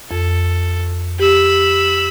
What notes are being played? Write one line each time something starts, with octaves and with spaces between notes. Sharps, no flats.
F2 A4
G4 B5 E6